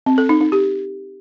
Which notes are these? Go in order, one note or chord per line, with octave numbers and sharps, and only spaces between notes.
C4
A4
D#4
D#4
G4